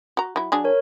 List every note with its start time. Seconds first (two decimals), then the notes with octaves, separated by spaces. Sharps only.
0.17 F#4 A#5
0.36 F#3 E4
0.52 F#3 D4 G#4
0.64 A#4 C#5